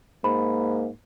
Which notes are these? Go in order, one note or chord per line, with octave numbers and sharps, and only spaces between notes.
G#2 A#3 B5